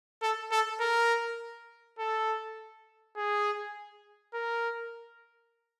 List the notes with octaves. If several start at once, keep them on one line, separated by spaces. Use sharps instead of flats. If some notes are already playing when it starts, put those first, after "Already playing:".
A4
A4
A#4
A4
G#4
A#4